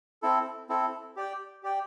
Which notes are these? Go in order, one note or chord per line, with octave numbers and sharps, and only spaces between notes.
C4 E4 A4
C4 E4 A4
G4 D5 G5
G4 D5 G5